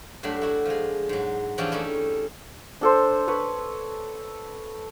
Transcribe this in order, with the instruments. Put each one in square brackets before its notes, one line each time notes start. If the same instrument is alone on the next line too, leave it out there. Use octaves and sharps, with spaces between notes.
[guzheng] G2 F#3 A3 D4 B5
E4 F#4
F3 G#3
G#2 F#3
E3 F3 C#4 D4 G4 D5
A3 C#4 D#4 E4
[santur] D4 A4 C5
B4 C#5